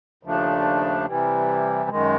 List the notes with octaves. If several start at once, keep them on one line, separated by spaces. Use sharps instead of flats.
D#2 C#3 F3 A3 D4
C3 E3 G3
F#2 D#3 G#3